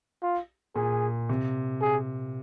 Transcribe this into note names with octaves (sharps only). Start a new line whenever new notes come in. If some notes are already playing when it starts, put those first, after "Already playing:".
F4
A#2 G#4
C3
G#4